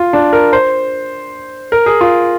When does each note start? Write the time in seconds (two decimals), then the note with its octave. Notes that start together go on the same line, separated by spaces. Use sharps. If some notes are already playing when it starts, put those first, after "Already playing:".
Already playing: F4
0.13 D4
0.33 A#4
0.53 C5
1.72 A#4
1.86 G#4
2.01 F4